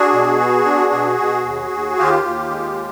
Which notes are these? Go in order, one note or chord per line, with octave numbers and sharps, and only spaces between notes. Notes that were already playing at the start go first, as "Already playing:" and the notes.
Already playing: D4 F#4 G#4
B2
B3
D4
B2
B2
D#2
D#2
D#2 F4 G4
D#2
G#3